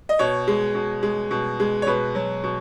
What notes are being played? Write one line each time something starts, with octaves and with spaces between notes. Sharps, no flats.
D#5
B2 C#5
G#3
B2
G#3
B2
G#3
C#5
B2 B4
F#3
B2